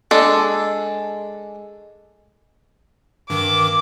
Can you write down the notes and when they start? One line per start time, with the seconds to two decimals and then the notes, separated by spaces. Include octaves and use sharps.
0.11 G#3 D4 A4
3.30 G2 D#3 D6